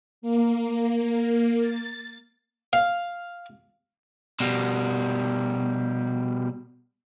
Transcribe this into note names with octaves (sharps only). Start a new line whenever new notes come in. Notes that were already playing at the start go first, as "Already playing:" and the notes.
A#3
A6
F5
B2 G3